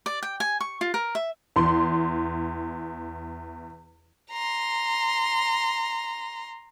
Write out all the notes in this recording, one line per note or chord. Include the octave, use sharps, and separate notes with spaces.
D5
G5
G#5
C#6
F4
A#4
E5
E2 C6
A#5 C6